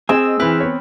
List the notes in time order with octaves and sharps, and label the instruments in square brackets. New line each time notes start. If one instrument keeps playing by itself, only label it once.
[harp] C4 [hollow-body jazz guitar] G#4 [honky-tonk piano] D#5 [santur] E6
[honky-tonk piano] E3 E4 [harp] C4 B4 F6
[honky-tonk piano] B3 C#5